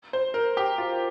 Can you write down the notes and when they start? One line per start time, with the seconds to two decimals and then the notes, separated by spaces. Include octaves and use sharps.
0.13 C5
0.34 A#4
0.57 G4
0.78 F4